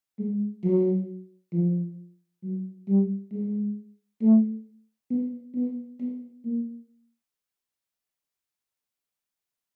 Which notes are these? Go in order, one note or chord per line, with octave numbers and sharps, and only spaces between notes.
G#3
F#3
F3
F#3
G3
G#3
A3
B3
B3
B3
A#3